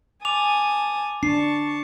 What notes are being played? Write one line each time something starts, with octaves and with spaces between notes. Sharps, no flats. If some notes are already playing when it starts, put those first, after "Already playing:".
G#5 A5 D6 D#6 F7
D4 A5 C#6 C7